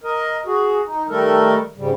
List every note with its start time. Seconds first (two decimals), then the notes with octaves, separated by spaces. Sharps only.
0.04 A#4 D#5
0.46 F#4 G#4
0.86 D#4
1.09 D#3 G3 A3 A4 A#4
1.77 G#2 C#3 G3